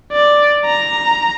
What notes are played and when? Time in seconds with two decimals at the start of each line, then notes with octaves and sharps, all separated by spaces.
0.13 D5
0.66 A#5